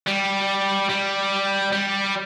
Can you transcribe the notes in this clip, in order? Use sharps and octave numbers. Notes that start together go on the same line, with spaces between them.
G3
G3
G3